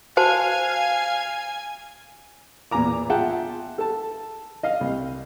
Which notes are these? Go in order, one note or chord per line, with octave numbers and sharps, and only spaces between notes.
F#4 C5 F5 G#5 A5
E2 A#2 G#5 A#5 D6
F4 G#4 E5 F#5 G5 A5
A4 A5
D#5 F5
C2